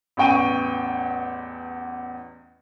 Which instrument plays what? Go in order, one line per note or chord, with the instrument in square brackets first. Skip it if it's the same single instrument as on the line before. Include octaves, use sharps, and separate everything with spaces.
[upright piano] A1 E2 G5 C#6 D#7